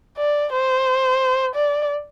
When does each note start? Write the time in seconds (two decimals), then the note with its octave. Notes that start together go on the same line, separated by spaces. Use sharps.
0.18 D5
0.52 C5
1.55 D5